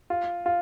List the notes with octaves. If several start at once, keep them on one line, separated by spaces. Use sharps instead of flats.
F4
F4